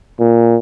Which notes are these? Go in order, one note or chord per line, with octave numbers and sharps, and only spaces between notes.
A#2